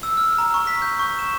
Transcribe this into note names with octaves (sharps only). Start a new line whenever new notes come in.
E6
F6
A#5
C#6
B6
G6
C#6
E7